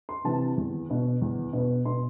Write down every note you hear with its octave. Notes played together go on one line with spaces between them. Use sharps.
C6
C3 E3 A5
E2
B2 B3
E2
B2 B3
B2 C6